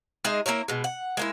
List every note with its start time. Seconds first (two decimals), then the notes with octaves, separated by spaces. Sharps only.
0.24 G#3 D#4 G#4 E5
0.46 A#3 E4 A#4 C#5
0.68 B2 G#3
0.84 F#5
1.17 G#3 A#3 E4